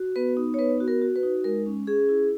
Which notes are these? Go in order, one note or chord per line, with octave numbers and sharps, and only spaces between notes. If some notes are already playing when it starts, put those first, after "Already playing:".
Already playing: F#4
B3 B4
D#4
C#5
B3 B4
F#4
A#4
F#4
B4
D#4
G#3 A#4
C#4
C#4 G#4
E4